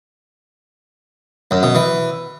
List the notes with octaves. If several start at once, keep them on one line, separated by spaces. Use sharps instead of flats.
F#2
B2
E3